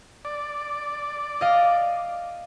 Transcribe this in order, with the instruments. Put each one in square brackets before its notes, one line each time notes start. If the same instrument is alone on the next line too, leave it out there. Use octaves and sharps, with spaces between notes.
[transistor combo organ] D5
[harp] D#5 F5